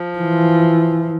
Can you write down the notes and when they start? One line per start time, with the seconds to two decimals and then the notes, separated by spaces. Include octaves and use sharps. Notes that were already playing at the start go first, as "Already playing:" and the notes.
Already playing: F3
0.19 E3